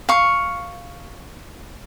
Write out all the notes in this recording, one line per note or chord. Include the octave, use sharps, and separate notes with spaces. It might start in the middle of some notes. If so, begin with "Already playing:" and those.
F5 C#6